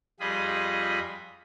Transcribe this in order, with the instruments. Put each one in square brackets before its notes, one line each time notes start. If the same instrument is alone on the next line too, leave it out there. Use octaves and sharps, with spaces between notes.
[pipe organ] F2 G3 F4 G#4 D#5 B5